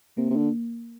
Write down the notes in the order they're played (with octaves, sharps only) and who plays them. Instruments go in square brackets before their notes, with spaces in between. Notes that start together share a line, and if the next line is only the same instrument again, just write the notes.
[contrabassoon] C3 [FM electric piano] A#3
[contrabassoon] C3
D3